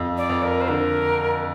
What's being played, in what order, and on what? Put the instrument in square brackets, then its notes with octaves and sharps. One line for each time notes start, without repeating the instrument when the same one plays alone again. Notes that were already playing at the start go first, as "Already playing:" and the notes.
Already playing: [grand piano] F2
[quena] D5
[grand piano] F2
[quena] A#4
C5
[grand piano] D3 [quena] A#4